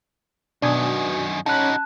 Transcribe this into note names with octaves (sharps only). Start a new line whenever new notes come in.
F#2 B2 D#3 D4 G#5 D#6
C#4 D#4 F#4 A5 B5 F#6 G#6